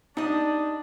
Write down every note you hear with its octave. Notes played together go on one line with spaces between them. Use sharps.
G3 D4 D#4 D#5